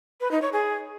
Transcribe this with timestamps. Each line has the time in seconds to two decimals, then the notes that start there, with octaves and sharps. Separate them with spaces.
0.21 B4
0.31 D#4
0.42 C#5
0.53 G#4